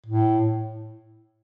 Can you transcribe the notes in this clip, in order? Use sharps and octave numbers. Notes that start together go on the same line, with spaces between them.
A2